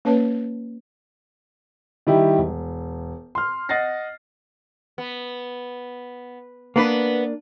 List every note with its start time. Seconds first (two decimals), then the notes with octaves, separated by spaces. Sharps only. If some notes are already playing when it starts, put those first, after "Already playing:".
0.05 A#3 C#4 B4 C#5 A5
2.07 D#3 G3 E4 G4
2.38 E1
3.35 C6 F6
3.69 D#5 F#5 A6 A#6 C7
4.98 B3
6.76 A#3 B3 D4 B4